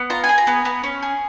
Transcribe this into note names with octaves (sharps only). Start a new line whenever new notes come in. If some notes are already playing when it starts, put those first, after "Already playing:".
Already playing: B3
F4 A#5
G#5
G#4
A#5
B3
B3
C#4
G#4